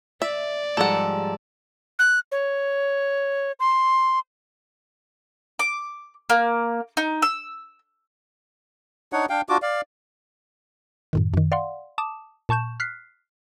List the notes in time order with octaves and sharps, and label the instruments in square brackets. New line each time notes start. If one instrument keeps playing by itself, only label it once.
[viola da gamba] D5 [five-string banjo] E5
[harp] G#2 F3 G3 [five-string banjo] A4 F#5 [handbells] A5 A#5 E6
[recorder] F#6
C#5
C6
[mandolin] D6
A#3
D#4
E6
[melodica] D4 D#4 C#5 F#5
D4 F5 G5
D4 F4 F#4 D6
D5 F5
[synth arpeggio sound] F#2 A2 D#3
F#2 D#3
D5 F5 F#5 C6
A5 D6 D#6 E7
A#2 A5 C#6 G6 E7
F6 F#6 B6 C7